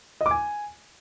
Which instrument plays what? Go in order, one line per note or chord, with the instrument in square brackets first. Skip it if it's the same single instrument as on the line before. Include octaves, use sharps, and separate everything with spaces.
[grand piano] D#5
D6
G#5